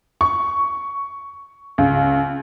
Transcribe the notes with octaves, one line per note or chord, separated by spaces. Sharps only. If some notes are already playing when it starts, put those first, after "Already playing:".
C#6
C#2